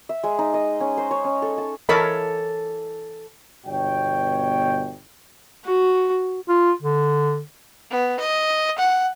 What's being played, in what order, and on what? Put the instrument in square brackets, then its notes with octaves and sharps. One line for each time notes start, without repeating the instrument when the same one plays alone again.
[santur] E5
G#3
D#4
D#5
C#4
C5
C#5
C#4
A4
A5
[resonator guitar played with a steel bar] E3 A4 C#5 [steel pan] A#4 D#5 B5
[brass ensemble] G1 B2 C#5 G5
[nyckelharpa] F#4
[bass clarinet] F4
D3
[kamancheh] B3
D#5
F#5